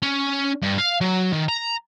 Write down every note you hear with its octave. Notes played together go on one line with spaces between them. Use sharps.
C#4
G2
F5
F#3
D#3
A#5